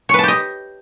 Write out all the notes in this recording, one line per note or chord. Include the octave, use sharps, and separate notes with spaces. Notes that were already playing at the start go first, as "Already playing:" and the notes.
G4 B4 C#5 D#5 A5